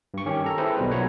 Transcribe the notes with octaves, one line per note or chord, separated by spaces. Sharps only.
G2 C#6
D#3 C#4 G4
A4 A#5
C4 E4 G#4 A4 B4 C5
B1 B2 G3 B4
B1 A#2 C#5 F#5 A#5 B5